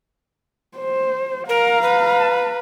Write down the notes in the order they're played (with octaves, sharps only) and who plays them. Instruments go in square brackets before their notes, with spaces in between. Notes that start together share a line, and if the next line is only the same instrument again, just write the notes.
[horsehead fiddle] C5
[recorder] A#4 [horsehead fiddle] F5 A#5
[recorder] B4